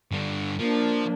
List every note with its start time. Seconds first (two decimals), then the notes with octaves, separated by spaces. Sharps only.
0.11 G2 D3
0.60 F3 A#3 D4